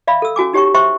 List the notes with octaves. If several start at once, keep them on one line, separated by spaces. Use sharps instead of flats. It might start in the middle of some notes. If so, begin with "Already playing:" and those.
D5 E5 F5 B5
A4 E6
C#4 F#4 G#5 D6
D#4 G4 C#5 G5 C#6
C5 E5 G5 C6 C#6